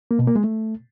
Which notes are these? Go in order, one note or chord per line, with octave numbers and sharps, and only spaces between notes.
A#3
B2
A#3
G#3
A3